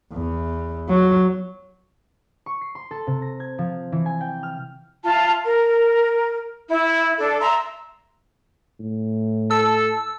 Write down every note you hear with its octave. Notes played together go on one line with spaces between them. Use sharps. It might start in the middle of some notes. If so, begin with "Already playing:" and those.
E2
F#3
C#6
C7
C6
A4
C3
A#6
G#6
F3
E3
G#5
G5
F6
F4 E5 A5
A#4
E4
D4 A4
E5 A#5 C6 E6
A2
A4 E6